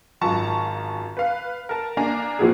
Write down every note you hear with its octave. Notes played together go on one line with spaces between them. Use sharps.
G#1 F#2 F4 A5 A#5 C#6
B4 F5
A#4 A5
A#3 D4 G#5 A#5
A#2 F3 C4 E4 F#4 G#4